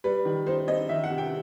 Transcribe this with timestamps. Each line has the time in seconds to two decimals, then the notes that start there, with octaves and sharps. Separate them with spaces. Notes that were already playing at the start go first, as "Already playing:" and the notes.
0.04 G3 B4
0.25 D#3
0.46 D#4 C5
0.68 C4 D#5
0.89 D#3 E5
1.04 F#5
1.11 C3
1.18 G5